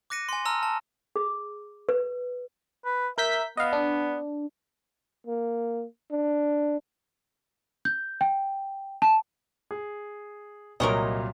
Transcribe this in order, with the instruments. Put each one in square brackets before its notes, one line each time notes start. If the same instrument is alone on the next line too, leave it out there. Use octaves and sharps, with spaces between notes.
[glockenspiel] D6 F#6 A#6 C#7 D#7
G#5 C6
A5 A#5 E6 F6
A5
[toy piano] G#4
B4
[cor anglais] B4
[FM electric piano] A#4 G6 B6 [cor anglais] E5
[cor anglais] B3 [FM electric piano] D#5 F5
[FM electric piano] D4
[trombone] A#3
D4
[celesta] G6
G5
A5
[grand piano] G#4
[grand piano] C2 A#2 F#3 [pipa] A#4 C#5 D#5